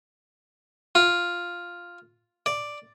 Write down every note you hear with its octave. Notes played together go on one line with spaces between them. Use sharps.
F4
D5